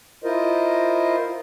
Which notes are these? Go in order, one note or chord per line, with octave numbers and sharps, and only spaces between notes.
E4 F4 A#4 C5 D#5